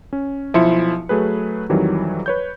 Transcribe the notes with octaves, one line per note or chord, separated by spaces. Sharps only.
C#4
B1 F3 E4 E5 C6 C#7
F#3 A3 G#4 B4
F2 D#3 E3 F#3 G3
B4 C#5 G6